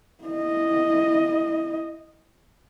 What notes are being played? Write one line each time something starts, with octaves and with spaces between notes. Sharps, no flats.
E4 D#5